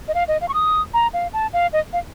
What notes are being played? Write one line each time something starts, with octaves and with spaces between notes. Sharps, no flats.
D#5
F5
D#5
F5
C#6
D#6
A#5
F5
A5
F5
D#5
F5